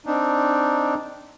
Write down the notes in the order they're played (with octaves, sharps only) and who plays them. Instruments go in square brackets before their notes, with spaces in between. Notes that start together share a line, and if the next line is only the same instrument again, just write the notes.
[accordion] C4 D4 D#4